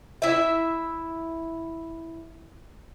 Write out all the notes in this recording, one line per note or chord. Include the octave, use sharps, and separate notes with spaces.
E4 E5